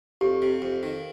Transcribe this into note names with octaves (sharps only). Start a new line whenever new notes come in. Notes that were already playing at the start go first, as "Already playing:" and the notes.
F2 G4
C3
F2
D#3